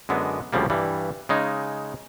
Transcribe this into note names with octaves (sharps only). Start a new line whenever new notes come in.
F#2 D3 G#3 B3
D2 C#3 F3 G3 A#3
G2 E3 G3
C#3 G#3 D#4